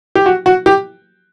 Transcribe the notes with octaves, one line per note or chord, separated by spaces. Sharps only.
G4
F#4
F#4
G4